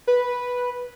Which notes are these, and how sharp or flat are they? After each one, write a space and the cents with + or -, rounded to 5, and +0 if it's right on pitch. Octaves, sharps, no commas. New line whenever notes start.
B4 -5